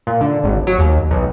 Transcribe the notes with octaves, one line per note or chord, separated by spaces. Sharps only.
A#2
D3
G#1
F#3
D#2
B1